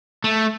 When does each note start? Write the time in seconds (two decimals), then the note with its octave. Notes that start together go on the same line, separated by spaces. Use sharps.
0.24 A3